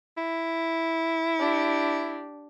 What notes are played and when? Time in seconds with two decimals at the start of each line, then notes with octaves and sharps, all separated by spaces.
0.18 E4
1.38 D4 G4